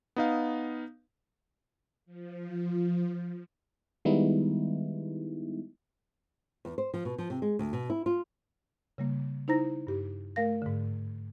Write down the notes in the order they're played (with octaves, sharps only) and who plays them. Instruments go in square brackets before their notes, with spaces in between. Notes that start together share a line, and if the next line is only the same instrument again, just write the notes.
[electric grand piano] B3 D#4 F5
[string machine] F3
[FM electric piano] D#3 G3 G#3 B3 D#4 E4
[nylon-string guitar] E2
C5
F3
B2
F3
C3
G#3
D2
B2
E4
F4
[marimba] C#3 G3 A#3
D#4 E4 C5 A#5 A#6
G2 G4
A3 A#4 F5 A#6
G#2 D3